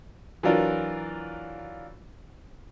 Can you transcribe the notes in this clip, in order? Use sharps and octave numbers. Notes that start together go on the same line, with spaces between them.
E3 F#3 D4 F4 A#4